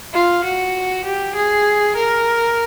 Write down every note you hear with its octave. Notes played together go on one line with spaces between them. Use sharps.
F4
F#4
G4
G#4
A#4